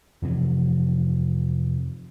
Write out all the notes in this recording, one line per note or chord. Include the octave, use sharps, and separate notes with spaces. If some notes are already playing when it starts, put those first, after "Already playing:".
F2 C3 E3 F3